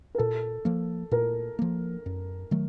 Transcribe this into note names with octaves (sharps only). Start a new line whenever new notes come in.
A#4
A#2 A4
F3 A#3
A#2 A#4
F3 A#3
F#2
D#3 F#3 A3